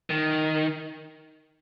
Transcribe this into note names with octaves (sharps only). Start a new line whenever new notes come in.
D#3